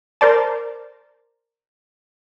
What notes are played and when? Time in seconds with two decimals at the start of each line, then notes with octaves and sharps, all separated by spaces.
0.21 A#4 C5 D5 A5